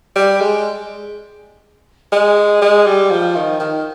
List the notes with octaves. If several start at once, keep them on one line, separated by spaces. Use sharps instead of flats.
G3
G#3
G#3
G#3
G3
F3
D#3
D#3